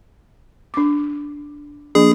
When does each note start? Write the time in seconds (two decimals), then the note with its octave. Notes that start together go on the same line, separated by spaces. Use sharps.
0.74 D4 D6
1.95 F3 A#3 D4 G#4